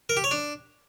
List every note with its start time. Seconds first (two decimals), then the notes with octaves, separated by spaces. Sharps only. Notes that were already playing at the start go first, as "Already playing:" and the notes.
0.09 A#4
0.17 G4
0.24 C#5
0.31 D4